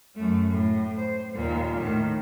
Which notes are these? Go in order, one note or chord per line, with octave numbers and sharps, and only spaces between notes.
F#2 A3
A2
C5
D#2 A#2
A2 D#3